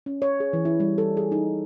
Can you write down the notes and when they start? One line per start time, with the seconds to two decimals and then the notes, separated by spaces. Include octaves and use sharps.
0.06 C#4
0.22 C#5
0.40 G#4
0.53 E3
0.65 E4
0.80 G3
0.98 A4
1.17 G#4
1.32 D#4